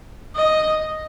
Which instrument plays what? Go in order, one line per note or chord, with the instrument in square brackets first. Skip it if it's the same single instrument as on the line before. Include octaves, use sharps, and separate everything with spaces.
[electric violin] D#5